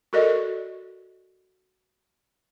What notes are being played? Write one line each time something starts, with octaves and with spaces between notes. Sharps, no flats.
F#4 A4 A#4 D5 D#5